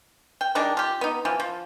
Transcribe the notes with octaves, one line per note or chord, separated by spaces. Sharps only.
G5
D#3 G3 G#3 D4
F4 G4
B3 D#4
E3 F3
F3